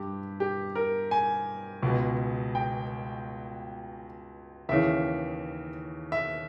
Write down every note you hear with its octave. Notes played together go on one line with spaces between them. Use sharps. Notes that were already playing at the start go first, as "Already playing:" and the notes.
Already playing: G2 G4
G4
A#4
G#5
C#2 B2
G5
D#2 C#3 E3 E5
E5